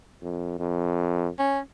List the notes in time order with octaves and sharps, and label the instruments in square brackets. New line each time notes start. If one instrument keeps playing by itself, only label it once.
[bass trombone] F2
F2
[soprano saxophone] C#4